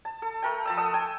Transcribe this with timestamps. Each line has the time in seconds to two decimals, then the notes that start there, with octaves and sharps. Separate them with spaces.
0.05 A5
0.22 A4
0.42 A3 A#4 G5
0.65 F3 A5 E6
0.77 A4 F#5 D#6 E6
0.94 G5 G#5